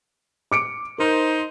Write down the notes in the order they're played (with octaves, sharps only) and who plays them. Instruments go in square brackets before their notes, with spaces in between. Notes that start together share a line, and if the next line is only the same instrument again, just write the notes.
[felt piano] D6 C#7 D7
[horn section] D#4 C5 [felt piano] A#4